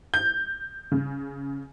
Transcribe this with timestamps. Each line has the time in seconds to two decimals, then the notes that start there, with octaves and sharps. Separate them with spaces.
0.14 G6
0.92 C#3